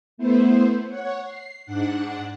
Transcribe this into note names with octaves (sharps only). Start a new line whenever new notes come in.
A3 B3 E4 C5
C#5 F#5
C7
G#2 D4 F#5 F#6